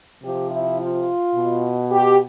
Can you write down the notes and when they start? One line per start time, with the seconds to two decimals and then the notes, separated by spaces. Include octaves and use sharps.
0.22 C3 F3 G4
0.50 E4
0.79 F4
1.35 B2
1.92 G4